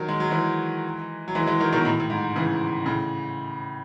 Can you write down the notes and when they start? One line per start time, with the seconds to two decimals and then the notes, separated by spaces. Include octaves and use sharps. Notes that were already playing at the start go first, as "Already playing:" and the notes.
Already playing: D#3 F#3
0.09 G#3
0.20 F#3
0.31 E3 G#3
1.28 F#3
1.35 E3 G#3
1.47 E3 G#3
1.60 D#3 F#3
1.72 B2 D#3
1.85 A2
2.00 A2
2.10 G#2
2.36 C#3 E3
2.85 A2 C#3